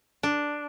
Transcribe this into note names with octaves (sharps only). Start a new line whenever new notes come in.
D4